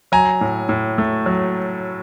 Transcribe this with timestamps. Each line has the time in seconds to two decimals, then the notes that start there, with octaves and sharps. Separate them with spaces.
0.12 F#3 G#5 A#5
0.41 A2
0.69 A2
0.98 A3
1.26 F#3